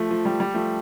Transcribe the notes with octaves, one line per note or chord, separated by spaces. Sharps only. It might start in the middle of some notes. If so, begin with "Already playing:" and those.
Already playing: F3 A3
F3
G3
G3
F3 A3